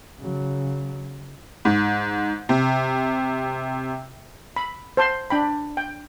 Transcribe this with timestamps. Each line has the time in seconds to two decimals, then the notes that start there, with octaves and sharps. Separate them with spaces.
0.20 C#3 F#3
1.65 G#2
2.49 C3
4.56 B5
4.97 C5 A5 C6
5.30 D4 G5 B5
5.77 G5